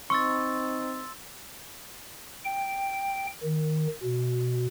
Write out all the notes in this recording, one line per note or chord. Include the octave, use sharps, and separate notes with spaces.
C4 D#4 C6 C#6 E6 A6
G5
D#3
B2